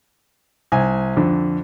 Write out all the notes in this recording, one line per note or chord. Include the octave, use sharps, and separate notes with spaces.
C2 G#5
F2 D3